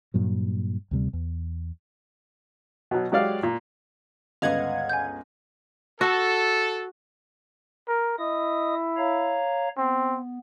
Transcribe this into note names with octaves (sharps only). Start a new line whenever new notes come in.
G2 A#2 F#3
D2 C3 G3
E2
B2 F#3
F#3 G#3 G4 D5 F5
A#2
G1 C#2 B4 D#5 F5 F#5 D#6 G#6
G#5 G6
F#4 A4
A#4
E4 D#5 D#6
C#5 F5 A#5
B3 C4